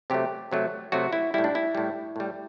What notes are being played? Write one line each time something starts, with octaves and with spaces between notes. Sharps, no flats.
C3 F#3 A3 G4
C3 F#3 A3
C3 F#3 A3 F#4
E4
A2 G3 E4
D4
E4
A2 G3
A2 G3